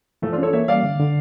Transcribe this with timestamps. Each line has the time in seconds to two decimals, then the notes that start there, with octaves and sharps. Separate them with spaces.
0.22 E3 F3 A3
0.32 D4 F4
0.38 C#4 A4 C#5
0.53 A#3 C#5 E5
0.68 G3 D5 F5
0.83 D3
1.00 D3